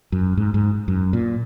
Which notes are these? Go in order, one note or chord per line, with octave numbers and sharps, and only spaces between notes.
F#2
G#2
G#2
F#2
A#2